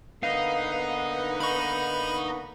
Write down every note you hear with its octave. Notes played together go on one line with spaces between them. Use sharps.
D3 A#3 B3 D#4 F5
D#4 B5 C#6